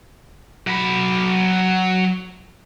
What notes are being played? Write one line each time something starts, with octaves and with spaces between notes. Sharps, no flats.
F#3 B5